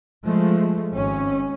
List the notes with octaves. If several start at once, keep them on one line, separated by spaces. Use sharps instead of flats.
F3 G#3 A3
G#1 C#4